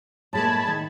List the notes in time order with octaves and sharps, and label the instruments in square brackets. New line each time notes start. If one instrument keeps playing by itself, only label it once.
[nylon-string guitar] A2 G#3 A#3 [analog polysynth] A5 B5 G#6
[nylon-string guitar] D#3